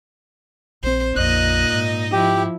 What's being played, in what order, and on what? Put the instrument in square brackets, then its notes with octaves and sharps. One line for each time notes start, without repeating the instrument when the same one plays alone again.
[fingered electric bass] A#1 C4 [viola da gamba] C5
[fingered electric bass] A#1 F2 [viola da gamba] A#2 D#4 D#5 [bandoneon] F#6
[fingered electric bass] G#2
[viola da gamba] F3 E4 [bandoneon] G4